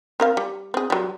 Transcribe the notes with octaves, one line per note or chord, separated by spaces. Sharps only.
C4 A#4 F5
G3
C4 G#4
F#3 G3